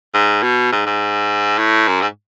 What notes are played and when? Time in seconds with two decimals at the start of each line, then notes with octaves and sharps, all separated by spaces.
0.14 G#2
0.43 B2
0.72 G#2
0.86 G#2
1.58 A2
1.88 F#2
2.02 G#2